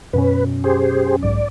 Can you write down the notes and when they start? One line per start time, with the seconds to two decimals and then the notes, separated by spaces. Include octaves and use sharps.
0.13 F#2 B2 C#4 B4
0.64 G4 G#4 C5
1.22 B1 G#2 D5